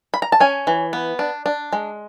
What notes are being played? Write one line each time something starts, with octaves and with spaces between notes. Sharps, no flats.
B5
A#5
A5
C#4 G#5
E3
B3
D4
D4
G#3